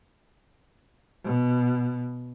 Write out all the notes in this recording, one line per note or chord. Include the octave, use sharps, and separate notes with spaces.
B2